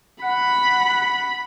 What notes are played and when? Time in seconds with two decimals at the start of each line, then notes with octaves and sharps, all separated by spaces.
0.23 F#5 B5